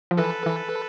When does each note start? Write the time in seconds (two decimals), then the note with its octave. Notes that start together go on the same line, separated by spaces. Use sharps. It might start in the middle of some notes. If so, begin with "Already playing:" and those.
0.11 F3
0.17 E3 A4 B4
0.46 E3